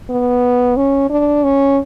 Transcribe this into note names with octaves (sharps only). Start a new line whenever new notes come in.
B3
C#4
D4
C#4